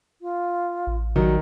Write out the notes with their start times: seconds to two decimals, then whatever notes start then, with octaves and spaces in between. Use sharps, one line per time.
0.21 F4
0.87 A1
1.16 D#3 F#3 G3